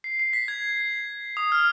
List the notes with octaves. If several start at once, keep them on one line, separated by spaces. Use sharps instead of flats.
C7
C7
B6
G#6
D#6
F6